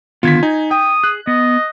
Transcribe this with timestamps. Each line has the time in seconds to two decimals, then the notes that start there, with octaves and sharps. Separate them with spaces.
0.23 D3 D#3 B3 F4 G#6 B6
0.43 D#4 G#5
0.71 G5 D#6
1.04 G#4 F#6
1.27 B3 D#5